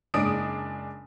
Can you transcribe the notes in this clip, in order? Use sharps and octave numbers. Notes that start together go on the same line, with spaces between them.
F#1 G#3 D4 D#6 D7